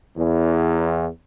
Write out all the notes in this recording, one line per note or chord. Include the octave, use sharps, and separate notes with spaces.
E2